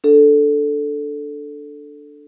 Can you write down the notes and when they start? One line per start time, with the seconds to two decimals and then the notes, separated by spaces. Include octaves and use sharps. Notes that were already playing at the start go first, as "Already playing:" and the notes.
0.04 D4 A4